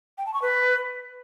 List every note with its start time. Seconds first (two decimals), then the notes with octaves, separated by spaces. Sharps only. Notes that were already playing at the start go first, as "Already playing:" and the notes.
0.18 G5
0.26 A5
0.34 C#6
0.42 B4